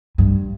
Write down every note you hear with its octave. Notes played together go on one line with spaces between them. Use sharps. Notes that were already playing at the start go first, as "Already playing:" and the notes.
G2